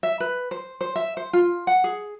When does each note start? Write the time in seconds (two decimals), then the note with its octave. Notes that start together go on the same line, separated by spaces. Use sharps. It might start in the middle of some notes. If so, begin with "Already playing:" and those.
0.03 E5
0.20 B4
0.51 C5
0.81 C5
0.96 E5
1.17 C5
1.33 F4
1.67 F#5
1.84 G#4